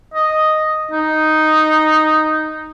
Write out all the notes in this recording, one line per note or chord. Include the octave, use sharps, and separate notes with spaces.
D#5
D#4